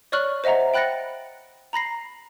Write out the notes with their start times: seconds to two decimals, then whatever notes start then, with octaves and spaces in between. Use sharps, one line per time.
0.12 C#5 D5 C#6 F6 F#6 F#7
0.44 C5 D#5 E5 F#5 A#5
0.74 G5 B5 F#6 A6 A#6 C#7
1.73 A#5 B5 A#6 C7